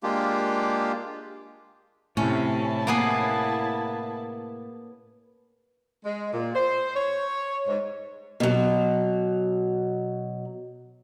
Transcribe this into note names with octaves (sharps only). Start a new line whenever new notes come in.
G#3 A#3 D4 F4 G4
A2 C3 C#4 E4 A5
A#3 B3 G#4
G#3
A#2
C5
C#5
G#2
B2 F#3